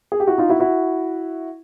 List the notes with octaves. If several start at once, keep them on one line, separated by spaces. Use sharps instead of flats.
G#4
G4
E4 F#4
D#4 F4
E4 F#4
E4 F#4